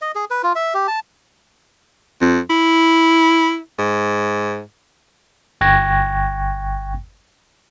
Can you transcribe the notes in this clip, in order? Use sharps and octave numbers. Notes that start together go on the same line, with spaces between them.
D#5
G#4
B4
F4
E5
G4
A5
F2
E4
G#2
G1 G5 C#6 F#6 G#6 A#6